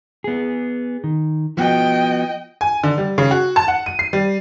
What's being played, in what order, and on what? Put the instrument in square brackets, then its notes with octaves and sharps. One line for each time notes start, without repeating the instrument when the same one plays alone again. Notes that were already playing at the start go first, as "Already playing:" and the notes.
[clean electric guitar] B3 G#4
D#3
[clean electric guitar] F3 B3 F#4 [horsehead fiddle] D#5 G5
[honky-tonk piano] G#5
D3
G3
C#3
F#4
A5
F#5
D#7
C7
G3